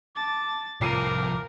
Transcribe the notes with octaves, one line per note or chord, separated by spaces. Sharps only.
A5 D6 A6
C2 F2 F3 A#4 F5 D6 C7 D#7